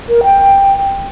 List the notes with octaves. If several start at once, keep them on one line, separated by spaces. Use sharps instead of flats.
A#4
G5